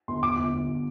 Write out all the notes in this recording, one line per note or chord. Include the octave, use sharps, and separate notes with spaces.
G1 C6
G1 D6
G1
G1